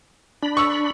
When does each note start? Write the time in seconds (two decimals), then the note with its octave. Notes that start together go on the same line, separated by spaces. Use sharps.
0.43 D4 B5
0.57 C#6 E6